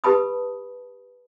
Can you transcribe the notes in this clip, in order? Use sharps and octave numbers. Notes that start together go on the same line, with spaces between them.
G4 B4 A5 B5 D#6